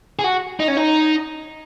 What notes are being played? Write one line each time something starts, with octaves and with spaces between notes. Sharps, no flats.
G#4
F#4
D#4
C#4
D#4